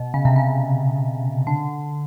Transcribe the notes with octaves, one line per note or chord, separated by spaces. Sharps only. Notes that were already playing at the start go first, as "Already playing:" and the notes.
Already playing: B2
C#3
C3
C#3
D3